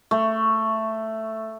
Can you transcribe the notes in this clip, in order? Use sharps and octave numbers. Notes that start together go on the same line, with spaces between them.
A3